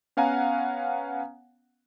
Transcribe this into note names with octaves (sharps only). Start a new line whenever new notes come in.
B3 C#4 F5 F#5 G#5 A#5